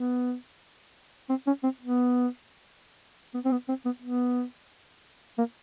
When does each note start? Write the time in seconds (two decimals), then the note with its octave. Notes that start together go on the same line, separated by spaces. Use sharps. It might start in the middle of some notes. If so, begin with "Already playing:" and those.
Already playing: B3
1.29 C4
1.47 C#4
1.64 C4
1.81 B3
3.34 B3
3.45 C4
3.52 B3
3.69 C4
3.85 B3
4.02 B3
5.38 A#3